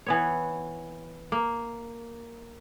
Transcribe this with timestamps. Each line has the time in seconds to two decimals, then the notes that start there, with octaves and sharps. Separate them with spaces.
0.06 E3 B3 C#5
1.32 A#3